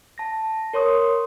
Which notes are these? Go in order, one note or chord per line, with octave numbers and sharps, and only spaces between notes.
A5 A#6
A#4 C#5 C6 C#6 D#6